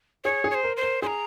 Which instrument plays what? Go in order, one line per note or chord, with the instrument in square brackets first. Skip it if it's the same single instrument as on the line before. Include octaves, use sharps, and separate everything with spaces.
[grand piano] G#4 [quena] C#5
[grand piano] G#4
[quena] C#5
C5
[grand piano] A#4
[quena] C5
[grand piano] A#4
[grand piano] G#4 [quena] A#5 C6